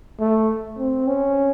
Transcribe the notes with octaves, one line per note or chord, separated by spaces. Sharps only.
A3
C4
C#4